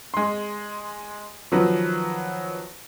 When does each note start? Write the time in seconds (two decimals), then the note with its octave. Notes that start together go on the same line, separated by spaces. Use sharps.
0.14 G#3 C6
1.52 D#3 F3 F#3 B4